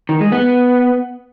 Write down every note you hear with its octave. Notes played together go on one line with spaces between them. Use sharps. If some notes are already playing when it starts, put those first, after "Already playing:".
D#3
G#3
B3